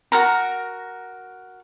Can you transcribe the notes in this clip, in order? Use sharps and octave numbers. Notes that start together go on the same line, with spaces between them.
F#4 A#4 A#5